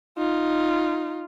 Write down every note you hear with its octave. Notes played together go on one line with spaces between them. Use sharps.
D#4 F4